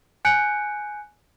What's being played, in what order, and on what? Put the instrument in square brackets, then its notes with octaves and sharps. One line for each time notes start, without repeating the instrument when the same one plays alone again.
[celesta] G#5 F#6 G6 C#7 D7